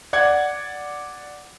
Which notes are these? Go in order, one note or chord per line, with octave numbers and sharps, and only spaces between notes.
D5 F#5 G#6